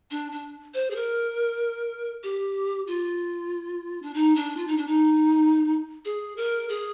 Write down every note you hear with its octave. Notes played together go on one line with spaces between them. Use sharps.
D4
D4
C5
G#4
A#4
G4
F4
D4
D#4
D4
F4
D#4
D4
D#4
G#4
A#4
G#4